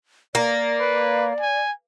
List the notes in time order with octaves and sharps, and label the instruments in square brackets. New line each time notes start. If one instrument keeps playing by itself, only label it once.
[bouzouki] A#3 [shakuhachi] D5
[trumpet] B4
G#5